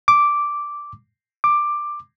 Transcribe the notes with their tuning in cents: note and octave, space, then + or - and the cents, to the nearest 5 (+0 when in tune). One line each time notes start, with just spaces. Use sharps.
D6 -5
D6 +10